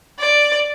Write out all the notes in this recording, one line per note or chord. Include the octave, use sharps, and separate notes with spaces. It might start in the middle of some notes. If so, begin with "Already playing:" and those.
D5